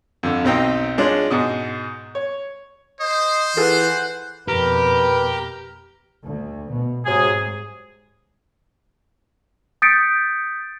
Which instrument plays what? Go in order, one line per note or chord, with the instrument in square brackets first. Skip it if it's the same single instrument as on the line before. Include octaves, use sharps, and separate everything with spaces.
[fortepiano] F2 D3
B1 C4 D#4 G5
G#3 C#4 D4 F4
G#2 B2 D#5
C#5
[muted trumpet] C5 [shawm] D#5
[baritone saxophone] E3 [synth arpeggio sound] F4 G#4 A4 [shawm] F#5
[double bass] F2 B2 [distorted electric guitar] G4 [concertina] A#4 A#5 [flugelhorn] B4
[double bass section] D2
B2
[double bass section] G#2 [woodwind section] C3 F#3 G#4
[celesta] D#6 G6 A6 B6 C#7 D7